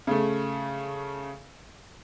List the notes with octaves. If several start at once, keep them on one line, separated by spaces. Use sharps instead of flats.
C#3 A3